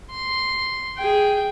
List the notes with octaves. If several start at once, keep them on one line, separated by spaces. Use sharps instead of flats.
C6
G#4 G5